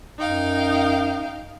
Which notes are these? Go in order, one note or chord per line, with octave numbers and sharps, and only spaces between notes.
F#2 D#4 F5 G5